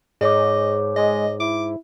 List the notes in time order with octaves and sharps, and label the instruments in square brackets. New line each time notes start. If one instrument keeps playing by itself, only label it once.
[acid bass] G#2 [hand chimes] G#4 C#5 D6 [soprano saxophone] D#5
[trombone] G#3 [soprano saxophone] D#5
[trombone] E4 [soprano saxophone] D6